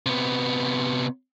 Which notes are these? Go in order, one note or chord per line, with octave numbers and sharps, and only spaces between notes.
C3 B3